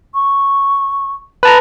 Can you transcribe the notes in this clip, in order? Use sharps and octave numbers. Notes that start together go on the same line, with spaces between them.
C#6
B4 A5 A#5